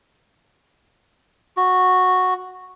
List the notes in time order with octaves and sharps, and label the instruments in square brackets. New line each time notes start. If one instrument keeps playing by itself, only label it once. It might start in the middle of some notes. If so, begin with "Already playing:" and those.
[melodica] F#4